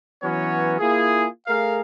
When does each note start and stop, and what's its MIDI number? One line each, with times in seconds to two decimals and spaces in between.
0.23 0.75 52
0.23 0.75 54
0.23 0.75 59
0.23 0.75 61
0.23 0.75 66
0.23 0.75 73
0.79 1.26 58
0.79 1.26 64
0.79 1.26 65
0.79 1.26 68
1.47 1.81 57
1.47 1.81 68
1.47 1.81 70
1.47 1.81 77